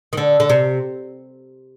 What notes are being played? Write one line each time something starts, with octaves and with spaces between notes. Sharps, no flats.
D#3
D3
D3
C3